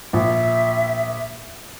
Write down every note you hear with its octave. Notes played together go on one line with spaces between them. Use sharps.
A#1 E5